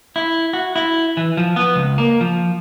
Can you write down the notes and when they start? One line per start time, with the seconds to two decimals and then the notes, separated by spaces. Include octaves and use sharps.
0.16 E4
0.53 F#4
0.76 E4
1.17 E3
1.37 F3
1.56 B3
1.76 C#2
1.98 A#3
2.21 F3